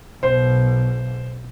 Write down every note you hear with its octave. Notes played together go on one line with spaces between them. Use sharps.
B1 B2 C5